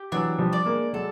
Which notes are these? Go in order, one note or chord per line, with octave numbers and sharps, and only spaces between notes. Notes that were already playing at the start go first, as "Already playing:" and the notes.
Already playing: G4
E3 F#3 D4
F3 G3
D5
G#3 A#3
F#3 G#3 A4